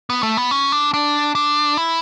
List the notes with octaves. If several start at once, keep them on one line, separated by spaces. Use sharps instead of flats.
B3
A3
B3
C#4
D4
D4
D4
E4